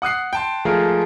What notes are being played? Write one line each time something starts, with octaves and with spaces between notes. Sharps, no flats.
F#5 D#6 F#6 C7
G5 A5 C6
F3 G#3 A3 F4 G#4 A#4